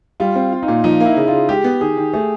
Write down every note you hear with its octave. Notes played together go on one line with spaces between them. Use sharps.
G3 F4
C4
F4
D#4
A#2
F3 D#4
A#3 E4
C#3
C#3 F4
G#3 G4
B3
D#3 G#4
D#3
A3 G#4